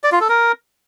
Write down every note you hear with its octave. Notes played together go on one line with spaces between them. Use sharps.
D5
F4
A4
A#4